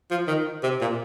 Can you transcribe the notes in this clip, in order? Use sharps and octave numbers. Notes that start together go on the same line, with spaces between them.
F3
D#3
C3
A#2